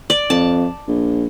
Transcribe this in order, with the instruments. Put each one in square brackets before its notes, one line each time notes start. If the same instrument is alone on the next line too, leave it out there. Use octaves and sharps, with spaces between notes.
[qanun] D5
[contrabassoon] F2 [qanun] A5
[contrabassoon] A#1